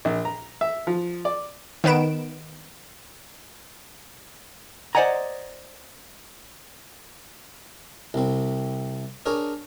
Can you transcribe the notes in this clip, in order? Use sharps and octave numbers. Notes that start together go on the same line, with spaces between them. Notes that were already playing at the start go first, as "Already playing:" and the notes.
A#1
A#5
E5
F3
D5
D#3 B3 B4 D7 E7
C5 D5 D#5 F#5 G#5 A#5
C2 C4
D4 G#4 A#4 C#5